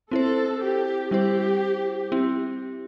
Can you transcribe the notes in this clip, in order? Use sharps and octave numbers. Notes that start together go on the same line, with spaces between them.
C4 E4 A4 C5
G4
G3 E4 G4 C5
C4 E4 G4